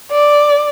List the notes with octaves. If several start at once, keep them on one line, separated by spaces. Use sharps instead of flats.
D5